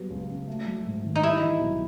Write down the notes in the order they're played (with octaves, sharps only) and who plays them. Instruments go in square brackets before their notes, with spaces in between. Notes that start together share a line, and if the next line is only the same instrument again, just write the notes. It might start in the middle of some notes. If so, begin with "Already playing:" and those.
Already playing: [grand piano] F#3 G3 B3
C#2
C#3
A3
F#3
G#2
D#3
[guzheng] D#4
[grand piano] G3 [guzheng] E4
[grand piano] E3
B1